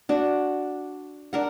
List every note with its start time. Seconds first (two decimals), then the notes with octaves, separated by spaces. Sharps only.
0.09 D4 F#4
1.33 D4 A#4 F#5